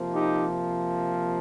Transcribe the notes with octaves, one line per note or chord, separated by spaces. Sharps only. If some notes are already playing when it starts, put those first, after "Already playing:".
Already playing: C3 F3 A#3
D#4 G4